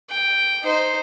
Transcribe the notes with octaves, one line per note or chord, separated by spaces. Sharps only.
G5
D#4 C5